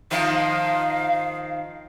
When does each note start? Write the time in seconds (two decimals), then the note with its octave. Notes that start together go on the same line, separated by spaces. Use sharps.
0.11 D#3 F3 D#4 F5